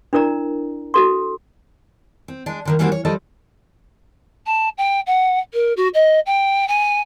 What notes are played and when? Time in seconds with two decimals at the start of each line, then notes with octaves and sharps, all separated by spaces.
0.13 D4 E4 A#4 D5 A#5
0.94 F#4 A4 C6
2.28 C4
2.46 G#3 D4
2.65 D3 D#3 A#3
2.79 E3 G3 A#3 C4 D4 F#4
2.92 C#5
3.05 F3 G3 A4 D5 D#5
4.46 A5
4.77 G5
5.06 F#5
5.53 A#4
5.77 F#4
5.94 D#5
6.26 G5
6.68 G#5